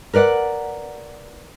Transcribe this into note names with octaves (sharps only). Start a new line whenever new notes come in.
A#4 B4 D5 F5 F#5